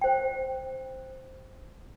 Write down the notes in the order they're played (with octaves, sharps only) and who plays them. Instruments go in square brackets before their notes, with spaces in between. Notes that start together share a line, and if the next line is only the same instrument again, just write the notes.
[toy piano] C5 G5